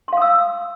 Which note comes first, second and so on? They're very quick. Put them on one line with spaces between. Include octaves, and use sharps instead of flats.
C6 F5 D#6 E6